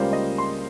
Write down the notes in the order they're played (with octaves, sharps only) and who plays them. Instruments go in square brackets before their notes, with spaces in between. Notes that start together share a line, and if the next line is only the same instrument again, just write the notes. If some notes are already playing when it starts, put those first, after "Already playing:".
Already playing: [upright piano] C#2 C#3 G3 A#3 F4 [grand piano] C5
[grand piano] D#5
C6